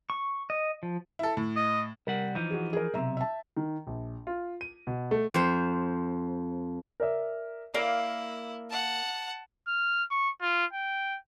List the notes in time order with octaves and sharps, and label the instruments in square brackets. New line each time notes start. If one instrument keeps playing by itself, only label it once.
[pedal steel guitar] C#6
D#5
F3
[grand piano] E4 A4
A2
[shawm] D#5
[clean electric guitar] C2 G3 F#5 [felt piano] A#4
[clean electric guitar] E3 F3 D#4 [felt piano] G6
[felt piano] F#4 G#4
G#4 A#4
[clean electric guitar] B1 A2 C3 [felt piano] E5 A#5
[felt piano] E5 A5
[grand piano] D#3
A#1
F4
D#7
B2
A3
[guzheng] F2 C5
[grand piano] A#4 D5 E5
[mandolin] A#3 [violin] E4 [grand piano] D5 F5
[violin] F#5 A5
[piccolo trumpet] F6
C#6
F4
G5